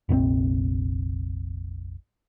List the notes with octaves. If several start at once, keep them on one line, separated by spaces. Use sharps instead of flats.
F1 A#1 A2 C4